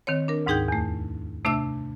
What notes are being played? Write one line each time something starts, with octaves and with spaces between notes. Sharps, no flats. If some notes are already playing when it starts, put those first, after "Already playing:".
D#3 C4 C#5
D4 A#4
D2 G#2 D#4 G#4 G5 G6
E2 A3
C3 A3 D4 E5 E6